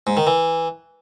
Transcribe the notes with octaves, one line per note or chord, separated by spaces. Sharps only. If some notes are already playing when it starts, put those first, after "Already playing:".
G#2
D#3
E3